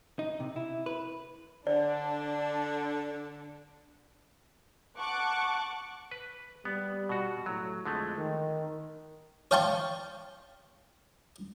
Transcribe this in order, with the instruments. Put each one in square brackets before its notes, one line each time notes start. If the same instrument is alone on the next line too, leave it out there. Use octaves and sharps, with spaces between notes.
[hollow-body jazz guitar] D#4
C3
E4
B4
[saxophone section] D3 [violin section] D4 [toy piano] D5
[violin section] F#5 A5 C#6 D6 F#6
[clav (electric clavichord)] B4
[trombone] G3 [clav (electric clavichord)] B3
[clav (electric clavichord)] B2 F#4
[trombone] A2 [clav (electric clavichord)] F#3
[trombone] F2 [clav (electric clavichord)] D3 G#3 A3
[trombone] D#3
[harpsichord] C#5 F5 G5 A5 C6 C#6